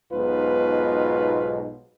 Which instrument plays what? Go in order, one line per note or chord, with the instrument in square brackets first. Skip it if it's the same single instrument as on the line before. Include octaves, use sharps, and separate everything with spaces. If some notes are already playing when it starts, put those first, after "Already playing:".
[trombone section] B1 G#2 B2 F4 B4